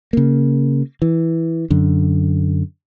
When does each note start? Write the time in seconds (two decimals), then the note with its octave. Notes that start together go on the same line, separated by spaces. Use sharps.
0.13 C#3 A#3
1.02 E3
1.70 F#2 D3